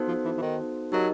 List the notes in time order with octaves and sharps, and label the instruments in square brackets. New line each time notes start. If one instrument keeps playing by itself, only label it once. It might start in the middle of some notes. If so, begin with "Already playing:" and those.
Already playing: [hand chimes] B3 D#4 F#4 A4 C5
[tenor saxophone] F3
E3
E3
D#3
[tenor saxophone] F#3 [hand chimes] D#4 G4 A#4 D#5